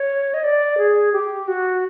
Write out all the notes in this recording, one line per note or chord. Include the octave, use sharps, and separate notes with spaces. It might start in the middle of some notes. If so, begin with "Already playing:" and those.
Already playing: C#5
D#5
D5
G#4
G4
F#4